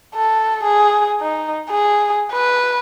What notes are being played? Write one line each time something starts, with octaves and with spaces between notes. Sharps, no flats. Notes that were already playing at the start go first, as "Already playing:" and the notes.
A4
G#4
D#4
G#4
B4